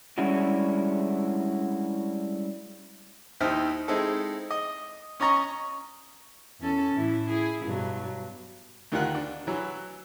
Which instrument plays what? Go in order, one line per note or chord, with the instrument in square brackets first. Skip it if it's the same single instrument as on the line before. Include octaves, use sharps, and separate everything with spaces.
[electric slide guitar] G3 G#3 C#4 D4 E4 F#4
[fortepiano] D#2 D#4 E4 C5 G5 F6
G#3 C4 D#4 E4 A4
D#5
C#4 C#5 D#5 A#5 C#6
[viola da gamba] E2 C#4 A4
A2 E3 E4
E4 G#4
G2 B2 F#3
[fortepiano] D2 D#3 F4 F#5 F#6
D4
E3 F#3